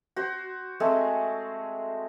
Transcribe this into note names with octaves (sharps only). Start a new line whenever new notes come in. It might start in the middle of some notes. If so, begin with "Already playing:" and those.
F#4 C5
G#3 A3 C4 G#4